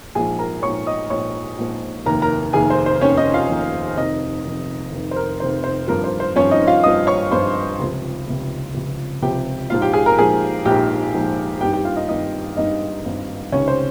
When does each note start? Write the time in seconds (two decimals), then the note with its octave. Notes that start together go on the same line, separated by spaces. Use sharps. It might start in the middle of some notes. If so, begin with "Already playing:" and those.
0.15 A#1 G#2 F3 G#4 G#5
0.39 A#4 A#5
0.62 A#1 G#2 F3 C#5 C#6
0.87 D#5 D#6
1.10 A#1 G#2 F3 C#5 C#6
1.58 A#1 G#2 F3
2.06 F1 D#2 D#3 A#4 A#5
2.22 A#4 A#5
2.53 F1 D#2 D#3 G#4 G#5
2.70 C5
2.86 C5
3.01 F1 D#2 D#3 C#4 C#5
3.17 D#4 D#5
3.34 F4 F5
3.49 F1 D#2 D#3
3.97 F1 F2 D#3 D#4 D#5
4.44 F1 F2 D#3
4.92 F1 F2 D#3
5.11 C5
5.16 A#4
5.40 F1 F2 D#3 C5
5.64 C5
5.88 G#1 G2 F3 A#4
6.04 C5
6.20 C5
6.36 G#1 G2 F3 C#4 C#5
6.51 D#4 D#5
6.67 F4 F5
6.83 G#1 G2 F3 D#5 D#6
7.07 C#5 C#6
7.31 G#1 G2 F3 C5 C6
7.79 C#2 C3 F3
8.27 C#2 C3 F3
8.74 C#2 C3 F3
9.22 C#2 C3 F3 G4 G5
9.70 A#1 G#2 F3 F4 F5
9.82 G4 G5
9.93 G#4 G#5
10.06 A#4 A#5
10.18 A#1 G#2 F3 G#4 G#5
10.65 A#1 G#2 F3 G4 G5
11.14 A#1 G#2 F3
11.61 G#1 G2 D#3 G4 G5
11.73 G4 G5
11.85 F4 F5
11.97 D#4 D#5
12.09 G#1 G2 D#3 D#4 D#5
12.57 G#1 G2 D#3 D#4 D#5
13.05 G#1 G2 D#3
13.52 C#2 C3 D#3 C#4 C#5
13.68 C5